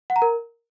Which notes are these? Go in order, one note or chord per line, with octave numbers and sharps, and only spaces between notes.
F#5
A#5
A#4